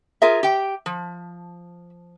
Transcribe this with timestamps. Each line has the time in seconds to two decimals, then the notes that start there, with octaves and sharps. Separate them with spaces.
0.22 F4 G#4 A#4 E5
0.43 G4 G5
0.86 F3